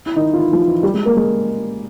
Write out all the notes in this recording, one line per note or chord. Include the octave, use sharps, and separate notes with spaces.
E4
D#3 D#4
F4
E3 E4
F3 F4
E3 E4
G3 G4
G#3 G#4
A#3 A#4
G#3 G#4